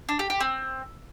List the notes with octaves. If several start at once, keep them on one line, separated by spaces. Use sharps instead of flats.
D4
G4
G4
C4